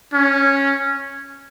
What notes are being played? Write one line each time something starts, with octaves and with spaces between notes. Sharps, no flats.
C#4